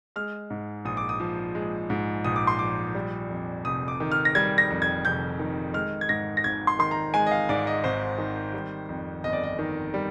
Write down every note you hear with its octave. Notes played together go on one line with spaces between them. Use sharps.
G#3 F6
G#2
A#1 D#6
D6
D#6
F3
G#3
G#2
A#1 D#6
D6
C6
F3 D6
G3
F2
F1 D#6
D6
D#3
F6
A#6
G3 G#6
A#6
F2
G#6
F1 G6
D#3
G#3 F6
G#6
G#2 A#6
A#6
G#1 G#6
C6
D#3 C6
A#5
G#3 G#5
D#5
F5
G#2 D5
D#5
G#1 C5
D#3
G3
F2
G1 D#5
D5
D#5
D#3
G3